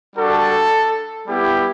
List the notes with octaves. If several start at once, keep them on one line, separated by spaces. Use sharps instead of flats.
G3 D4 F#4 A4
G3 B3 E4 G4